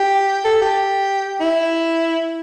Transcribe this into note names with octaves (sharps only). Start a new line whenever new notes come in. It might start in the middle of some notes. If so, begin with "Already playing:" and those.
Already playing: G4
A4
G4
E4